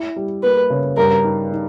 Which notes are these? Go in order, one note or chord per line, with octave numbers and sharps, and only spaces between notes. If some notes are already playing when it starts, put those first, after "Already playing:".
Already playing: E4
G3
A#3 B4
C#3
G2 A#4
D#4
D#4